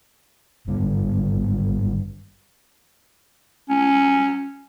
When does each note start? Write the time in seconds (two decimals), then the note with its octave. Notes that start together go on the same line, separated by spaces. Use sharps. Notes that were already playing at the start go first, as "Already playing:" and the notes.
0.67 G#1 G2 D3
3.69 C#4